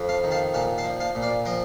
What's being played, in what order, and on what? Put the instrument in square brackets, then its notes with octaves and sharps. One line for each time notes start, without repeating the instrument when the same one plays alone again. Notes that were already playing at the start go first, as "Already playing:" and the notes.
Already playing: [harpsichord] F2
F5 A5
D#3
F5 A5
A#2 F5 A5
F5 A5
F3
F5 A5
A#2
D5 F5
F3 D#5 G5